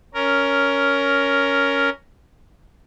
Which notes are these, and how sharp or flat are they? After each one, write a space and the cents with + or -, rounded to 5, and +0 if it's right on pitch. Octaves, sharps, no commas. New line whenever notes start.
C#4 +10 A#4 +0